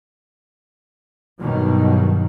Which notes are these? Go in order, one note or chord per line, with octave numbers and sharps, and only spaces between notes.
G2 B2 D#3 F#3